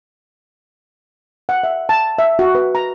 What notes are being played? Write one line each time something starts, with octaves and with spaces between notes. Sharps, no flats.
F#5
E5
A5
E5
F#4
B4
A#5